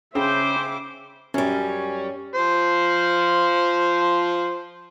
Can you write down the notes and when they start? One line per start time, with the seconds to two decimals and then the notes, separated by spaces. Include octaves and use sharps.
0.15 C#3 C#4 C5 E5 G5 D6
1.34 F#2 G3 C#4
2.35 F3 C5